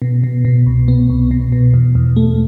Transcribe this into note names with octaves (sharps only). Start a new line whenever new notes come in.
B2
B2
B2
C2
B3
C2
B2
B2
E2
E2
A3